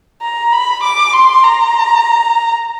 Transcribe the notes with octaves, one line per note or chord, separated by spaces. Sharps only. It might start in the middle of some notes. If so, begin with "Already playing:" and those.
A#5
B5
D6
C6
A#5